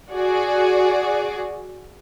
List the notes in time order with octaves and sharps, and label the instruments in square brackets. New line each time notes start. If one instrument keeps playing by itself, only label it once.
[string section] F#4 G#4 D5